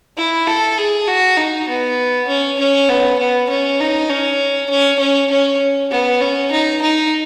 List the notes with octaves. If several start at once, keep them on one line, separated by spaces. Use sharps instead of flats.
E4
A4
G#4
F#4
D#4
B3
C#4
C#4
B3
B3
C#4
D#4
C#4
C#4
C#4
C#4
B3
C#4
D#4
D#4